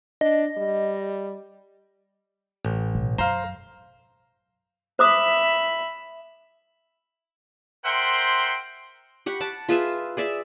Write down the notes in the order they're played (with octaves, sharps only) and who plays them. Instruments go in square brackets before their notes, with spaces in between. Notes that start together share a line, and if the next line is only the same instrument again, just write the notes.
[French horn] D4 [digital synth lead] D#5
[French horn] G3
[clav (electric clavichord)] A1
[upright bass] B1
[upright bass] F#2 [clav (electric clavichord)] C5 [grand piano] F5 A#5
[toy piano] C5 D6 D#6 [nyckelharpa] E5 B5
[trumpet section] A#4 C5 E5 F#5 G5 C6
[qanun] G4 F#5 B5 C#6
F#5 A5 D6
F4 G#4 B4 E5
G#4 D5 E5